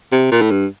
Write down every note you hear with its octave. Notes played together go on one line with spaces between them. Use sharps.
C3
A#2
A2
G2